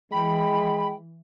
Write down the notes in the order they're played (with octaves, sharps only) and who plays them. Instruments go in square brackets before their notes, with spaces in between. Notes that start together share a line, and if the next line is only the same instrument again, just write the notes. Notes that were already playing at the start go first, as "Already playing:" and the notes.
[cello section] E3 [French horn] G#3 [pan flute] G5 [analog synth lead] B5